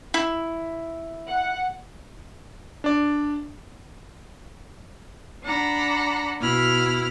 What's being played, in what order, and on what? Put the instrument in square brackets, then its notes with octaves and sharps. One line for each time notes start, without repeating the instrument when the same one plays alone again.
[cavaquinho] E4
[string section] F#5
[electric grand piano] D4 D5
[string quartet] D4 F#5 A#5 B5
B2 E4 B5 F6